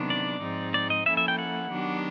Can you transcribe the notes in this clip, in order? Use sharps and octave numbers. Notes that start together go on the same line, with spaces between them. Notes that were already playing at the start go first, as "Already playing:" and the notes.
Already playing: C3 D#3 F#3 B3 D4
D5
G#2 F3 G#3 C4 D#4
D5
D#5
F3 A#3 C#4 E4 A4 E5
E5
G5
F#5
D#3 F#3 B3 D4 G4